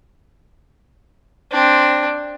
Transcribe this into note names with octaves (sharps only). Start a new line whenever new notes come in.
C4 D4